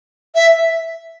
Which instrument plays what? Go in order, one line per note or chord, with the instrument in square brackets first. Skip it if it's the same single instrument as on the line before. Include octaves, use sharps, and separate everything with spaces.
[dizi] E5